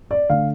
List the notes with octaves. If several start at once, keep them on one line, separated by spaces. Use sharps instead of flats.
D5
D3 A3 F5